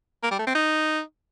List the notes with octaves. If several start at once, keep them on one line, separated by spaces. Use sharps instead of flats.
A#3
G3
A3
C4
D#4